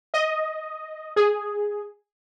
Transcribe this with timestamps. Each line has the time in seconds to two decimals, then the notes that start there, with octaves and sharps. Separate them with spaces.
0.14 D#5
1.16 G#4